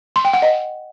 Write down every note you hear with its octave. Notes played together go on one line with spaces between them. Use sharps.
C6
G5
F#5
D#5